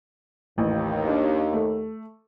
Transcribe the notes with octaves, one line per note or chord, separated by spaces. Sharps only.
A1 D#2
D4
A3